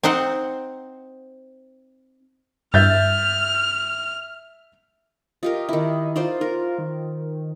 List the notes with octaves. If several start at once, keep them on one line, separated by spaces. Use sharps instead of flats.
C4 D#4 C5 F#5
G2 E5 F6 G6 A6
F4 G4 A#4 D#5
D#3 E4
D#4 F4 C5 D5
F4 A#4
D#3